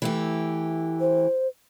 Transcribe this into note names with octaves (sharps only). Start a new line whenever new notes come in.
E3 A3 G4
C5